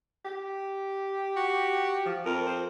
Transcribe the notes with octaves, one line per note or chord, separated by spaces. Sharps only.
G4
F#4
F3
F2 A#4
C5